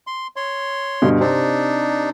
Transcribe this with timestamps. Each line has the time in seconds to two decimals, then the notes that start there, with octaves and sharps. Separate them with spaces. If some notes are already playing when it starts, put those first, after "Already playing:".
0.07 C6
0.36 C#5 C6
1.02 G2 B2 D3
1.20 C3 C4 D4 D#4